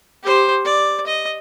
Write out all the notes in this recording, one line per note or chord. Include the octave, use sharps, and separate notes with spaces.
G4 C5
D5
D#5